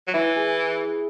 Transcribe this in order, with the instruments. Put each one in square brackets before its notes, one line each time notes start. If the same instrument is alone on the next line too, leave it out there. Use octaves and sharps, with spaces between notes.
[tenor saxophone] F#3
[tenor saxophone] E3 [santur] E4
[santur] G#4